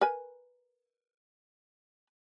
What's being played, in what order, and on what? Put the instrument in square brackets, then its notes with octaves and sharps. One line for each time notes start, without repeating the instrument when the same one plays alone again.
[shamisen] A#4 B4 G#5